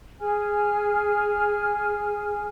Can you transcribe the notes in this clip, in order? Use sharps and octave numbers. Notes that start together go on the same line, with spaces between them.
G#4 G#5 F6